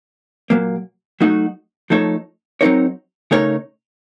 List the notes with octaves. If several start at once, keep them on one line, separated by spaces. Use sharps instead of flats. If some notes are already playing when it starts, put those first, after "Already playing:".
A#2 F#3 A#3
F#3 A3 D#4 F#4
F3 A3 D#4 A4 C#5
F#3 C4 D#4 A#4 C#5
C#3 A3 D#4 A#4 C#5